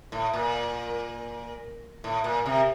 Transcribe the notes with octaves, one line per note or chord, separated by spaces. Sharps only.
A2
A#2
A2
A#2
C3